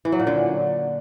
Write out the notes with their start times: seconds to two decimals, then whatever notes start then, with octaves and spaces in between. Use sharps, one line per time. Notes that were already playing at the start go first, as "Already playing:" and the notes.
0.05 E3
0.12 F#3
0.20 A#2
0.27 D3